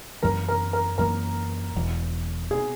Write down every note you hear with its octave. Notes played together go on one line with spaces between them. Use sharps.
F#2 E3 A#3 A#4
A#4
A#4
F#2 E3 A#3 A#4
E1 E2 B2
B2 G#4